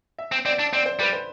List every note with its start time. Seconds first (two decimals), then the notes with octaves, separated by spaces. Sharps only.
0.18 E5
0.32 C4
0.46 C4 D5
0.59 D4
0.73 C4 D5
0.86 C5
0.99 G3 B4
1.13 C5